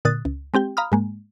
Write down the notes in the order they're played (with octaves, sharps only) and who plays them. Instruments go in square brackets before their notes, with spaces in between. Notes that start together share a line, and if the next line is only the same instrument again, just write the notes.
[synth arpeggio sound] A#2 D3 D#6 F#6 A6
C#2
G#3 C4 G4 G5
F5 A#5 B5 D#6 F6
G#2 G#3 A#3